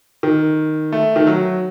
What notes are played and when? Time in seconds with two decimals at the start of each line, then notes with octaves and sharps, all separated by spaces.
0.23 D#3
0.92 A3
1.16 D#3
1.27 F#3